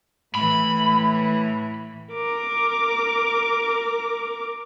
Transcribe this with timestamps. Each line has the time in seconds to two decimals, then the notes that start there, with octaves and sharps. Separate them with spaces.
0.35 A2 E3 B5
2.14 A#4 D6